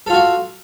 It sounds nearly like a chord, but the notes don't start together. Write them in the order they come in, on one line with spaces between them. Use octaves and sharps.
A4 F4 F#4